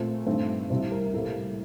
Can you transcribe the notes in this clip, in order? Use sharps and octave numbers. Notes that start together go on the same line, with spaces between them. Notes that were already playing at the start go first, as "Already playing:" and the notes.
Already playing: A#2 A3 C4
G2 D#3 A3 C4
C2 C3 G3 C4 C5
A#4
A2 G3 A#3 A4